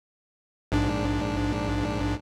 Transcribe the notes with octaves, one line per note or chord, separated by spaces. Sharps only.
A#1 G#2 D4